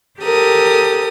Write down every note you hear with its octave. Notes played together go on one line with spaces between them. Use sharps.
G4 A4 A#4 D#6